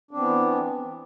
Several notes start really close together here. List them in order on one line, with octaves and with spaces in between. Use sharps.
D4 C4 E3 B3